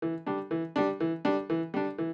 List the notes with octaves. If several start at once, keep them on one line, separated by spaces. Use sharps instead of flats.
E3
G3 D4
E3
G3 D4
E3
G3 D4
E3
G3 D4
E3